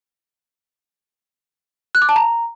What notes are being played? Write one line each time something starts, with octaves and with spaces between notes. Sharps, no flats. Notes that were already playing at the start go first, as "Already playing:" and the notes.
F#6
D6
A5
A#5